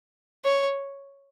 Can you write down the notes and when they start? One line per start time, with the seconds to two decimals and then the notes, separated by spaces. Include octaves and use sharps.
0.45 C#5